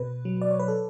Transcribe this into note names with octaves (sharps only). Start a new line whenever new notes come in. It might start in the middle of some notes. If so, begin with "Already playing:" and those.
Already playing: B2 B4
F#3
D5
C#5
B4
A4